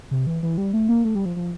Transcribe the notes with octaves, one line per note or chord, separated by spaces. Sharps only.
C3
E3
E3
G3
A3
A#3
A3
G3
F3
F3